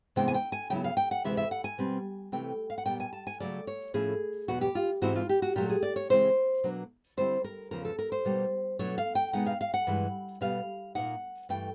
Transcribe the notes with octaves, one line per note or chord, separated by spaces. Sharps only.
C3 E3 G#3 B3 D4 G5
G#5
G5
G#5
C#3 F#3 B3 E4 G5
F5
G5
F#5
D2 C3 E3 G#3 E5
E5
F#5
G#5
B2 G3 C4
C3 E3 A3 C4 G5
F5
F#5
A#2 G3 B3 G5
G#5
A5
G#5
C#3 F#3 A3 D5
C#5
A2 F3 A3 C#4 E4 G#4
E2 B2 F#3 F#4
G4
F4
G#2 E3 G#3 C4 E4 F#4
F4
G4
F#4
A#2 F#3 A3 G4
G#4
D5
C#5
C#3 E3 G#3 C4 E4 C5
B2 F#3 A#3 D4
D3 G3 C4 E4 C5
A#4
E2 C#3 F3 A#4
A4
A#4
C5
B2 G3 A#3 D#4
B2 F#3 A3 D4 C#5
F5
G5
B2 G#3 B3 D#4 F#5
F5
F5
F#5
G2 E3 G#3
B2 G3 B3 F5
A#2 F#3 A#3 D#4 F#5
G2 E3 A3 G5